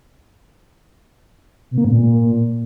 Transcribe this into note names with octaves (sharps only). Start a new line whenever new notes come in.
B2
A#3
G#2
A#2